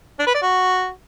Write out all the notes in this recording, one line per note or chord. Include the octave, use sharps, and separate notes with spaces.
D4
B4
D5
F#4